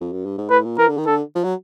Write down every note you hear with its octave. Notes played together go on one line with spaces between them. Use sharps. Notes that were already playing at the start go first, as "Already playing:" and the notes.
F2
F#2
G2
G#2
A2 B4
A#2
E3 A#4
D3
D#3
D3 A4
F3
F#3